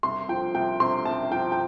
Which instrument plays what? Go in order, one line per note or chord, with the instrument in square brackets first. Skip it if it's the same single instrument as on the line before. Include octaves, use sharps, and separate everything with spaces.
[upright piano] C2 C6
F3 G5
C2 G5
C3 C6
C2 A5
F3 G5
G5